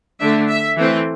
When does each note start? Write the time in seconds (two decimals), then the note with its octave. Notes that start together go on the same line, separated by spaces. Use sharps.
0.20 D3 A3 D4 E5
0.49 E5
0.76 E3 A3 C4